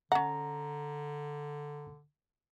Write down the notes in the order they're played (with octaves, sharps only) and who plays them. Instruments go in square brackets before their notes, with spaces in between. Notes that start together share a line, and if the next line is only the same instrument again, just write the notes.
[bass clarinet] D3 [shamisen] C#4 F#5 [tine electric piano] A#5